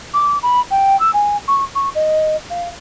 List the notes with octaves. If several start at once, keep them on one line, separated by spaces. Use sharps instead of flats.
D6
B5
G5
E6
G#5
C#6
C#6
D#5
F5